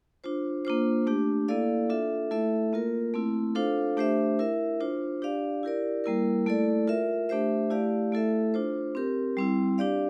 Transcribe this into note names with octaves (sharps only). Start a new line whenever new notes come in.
D4 F4 C5
A#3 D4 F4 C5
A3 D4 G4
A#3 E4 A4 D5 F5
D4 F4 A4 E5
A3 E4 A4 E5
A#3 F4 A#4
A3 C4 E4
D4 F4 A4 C5 F5
A3 D4 G4 C5 E5
E4 A#4 E5
D4 F4 C5
D4 G4 D5 F5
E4 G4 A#4 D5
G3 A#3 E4 A#4
A3 E4 A4 D5
F4 A#4 E5
A3 D4 G4 C5 E5
A3 E4 G4 D5 F5
A3 E4 A4 E5
D4 F4 C5
C4 G4 A#4
G3 C4 E4
D4 G4 D5 F5